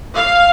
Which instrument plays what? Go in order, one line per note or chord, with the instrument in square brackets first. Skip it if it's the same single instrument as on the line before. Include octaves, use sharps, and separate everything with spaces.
[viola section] F5